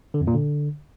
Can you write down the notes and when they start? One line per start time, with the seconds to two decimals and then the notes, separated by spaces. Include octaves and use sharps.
0.14 D3
0.21 F2
0.27 A#2
0.34 D3